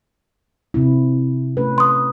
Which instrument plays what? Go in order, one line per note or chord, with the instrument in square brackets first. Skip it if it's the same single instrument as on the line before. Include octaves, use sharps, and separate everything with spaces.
[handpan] C3 C4 E4
A3 C#4 B4
[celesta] C6 D#6